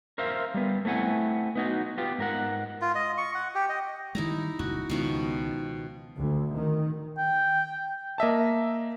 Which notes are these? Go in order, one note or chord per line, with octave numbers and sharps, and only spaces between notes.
A#4 C5 E5 F5
G3 B3
A3 C4 E4 F#5 G#5
B3 D#4 F#4
B3 F4 G4
G#2 A#4 F#5
F4
D#5
C#6
F#5
G4
D#5
D#3 G3 G#3 D#4 E4 A#5
D#1 C#2 F#2 F#4
C#2 B2 D#3 F3
D2
D#3
G5
A#3 D#5 E5 A5